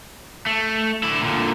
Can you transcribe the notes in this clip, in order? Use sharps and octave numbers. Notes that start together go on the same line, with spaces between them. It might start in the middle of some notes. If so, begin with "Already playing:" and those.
A3
D3 E4
A#2 D3